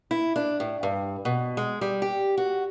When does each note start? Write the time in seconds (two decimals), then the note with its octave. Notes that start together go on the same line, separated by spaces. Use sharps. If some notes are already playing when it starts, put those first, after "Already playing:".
0.11 E4
0.36 D4
0.60 A2
0.83 G2
1.25 B2
1.57 G#3
1.81 G3
2.02 G4
2.37 F#4